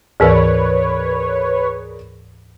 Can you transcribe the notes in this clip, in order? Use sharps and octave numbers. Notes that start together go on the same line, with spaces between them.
D2 G#2 E3 G#4 A#4 B4 C#5 D5